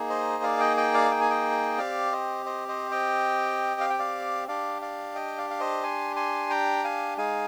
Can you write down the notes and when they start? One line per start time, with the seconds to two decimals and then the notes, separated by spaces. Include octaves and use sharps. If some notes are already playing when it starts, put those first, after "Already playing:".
Already playing: A#3 D#4 G#4
0.10 C5 D#5
0.43 D5 F5
0.60 D#5 G5
0.77 D#5 G5
0.94 D5 F5
1.11 G5
1.21 G#5
1.30 D#5 G5
1.78 C4 G4 D5 F5
2.12 C5 D#5
2.46 C5 D#5
2.68 C5 D#5
2.91 D#5 G5
3.81 F5
3.90 G5
3.99 D5 F5
4.48 D4 G4 D5 F5
4.82 D5 F5
5.15 D#5 G5
5.38 D5 F5
5.50 F5
5.60 C5 D#5
5.83 G#5 C6
6.16 G#5 C6
6.50 G5 A#5
6.84 F5 G#5
7.17 G#3 D#4 G#4 F5 G#5